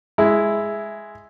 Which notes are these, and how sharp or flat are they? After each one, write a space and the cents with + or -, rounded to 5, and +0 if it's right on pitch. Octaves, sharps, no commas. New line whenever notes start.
G#3 +0 E4 +0